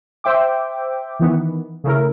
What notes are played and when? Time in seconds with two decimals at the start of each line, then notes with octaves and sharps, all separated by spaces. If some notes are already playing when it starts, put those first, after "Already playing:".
0.24 C5 E5 G5 D6
1.19 D#3 E3 B3
1.84 C#3 A3 E4 A#4